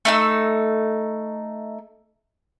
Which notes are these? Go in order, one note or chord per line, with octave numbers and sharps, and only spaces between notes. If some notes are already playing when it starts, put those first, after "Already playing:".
A3 D#4 E6